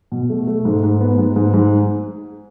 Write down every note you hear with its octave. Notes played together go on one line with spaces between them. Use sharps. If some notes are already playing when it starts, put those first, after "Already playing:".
B2
A3
A3
G#2
G#2
B3
G#2
G#2
G#2